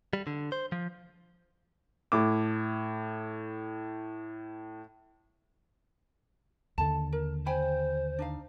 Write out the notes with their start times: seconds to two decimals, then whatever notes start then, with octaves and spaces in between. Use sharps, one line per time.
0.13 G3
0.27 D3
0.52 C5
0.72 F3
2.12 A2 D6
6.78 D#2 D3 A4 A5
7.13 A#4
7.46 C5 G5 G#5 B5
8.19 D4 D#4 F5